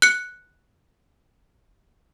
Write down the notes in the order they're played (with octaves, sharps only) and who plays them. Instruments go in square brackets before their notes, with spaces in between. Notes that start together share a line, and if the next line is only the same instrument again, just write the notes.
[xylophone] F#6 C#7